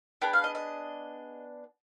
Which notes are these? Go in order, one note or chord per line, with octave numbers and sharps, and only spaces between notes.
B3 D4 G#4 G5
F5
D#5
D#5